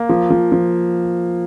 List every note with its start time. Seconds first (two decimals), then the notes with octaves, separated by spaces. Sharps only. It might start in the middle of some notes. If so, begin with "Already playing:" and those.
Already playing: A#3
0.09 F3
0.30 F3
0.52 F3